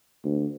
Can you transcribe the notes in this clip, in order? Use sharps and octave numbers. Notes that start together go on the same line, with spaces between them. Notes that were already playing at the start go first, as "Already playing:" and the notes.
D2